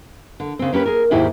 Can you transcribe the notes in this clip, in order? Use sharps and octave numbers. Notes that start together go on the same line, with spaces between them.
D3
C#3 C4
A#3 C#4 G4 B4
G#4 A#4
D#2 G#2 D#3 E4 G4 G#4